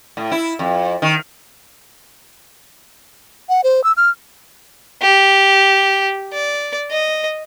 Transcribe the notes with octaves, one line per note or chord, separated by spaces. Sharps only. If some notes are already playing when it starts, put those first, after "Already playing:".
A2
E4
F2
D#3
F#5
C5
E6
F6
G4
D5
D#5